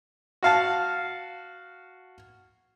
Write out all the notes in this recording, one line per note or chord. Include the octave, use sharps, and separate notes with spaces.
F#4 F5 A5